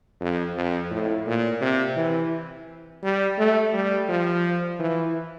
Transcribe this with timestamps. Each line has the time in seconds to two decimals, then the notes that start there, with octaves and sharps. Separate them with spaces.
0.20 F2
0.55 F2
0.91 A2
1.26 A#2
1.61 C3
1.97 E3
3.03 G3
3.38 A3
3.73 G3
4.09 F3
4.79 E3